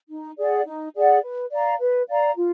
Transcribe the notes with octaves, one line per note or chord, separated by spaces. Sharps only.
D#4
G#4 D5 F#5
D#4
G#4 D5 F#5
B4
D5 F5 A#5
B4
D5 F5 A#5
F4